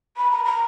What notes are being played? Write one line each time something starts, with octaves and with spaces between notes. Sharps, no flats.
B5
A#5
A#5